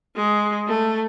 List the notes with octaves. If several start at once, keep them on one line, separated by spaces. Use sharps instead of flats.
G#3
A3